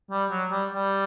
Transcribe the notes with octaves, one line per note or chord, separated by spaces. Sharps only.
G3
F#3
G3
G3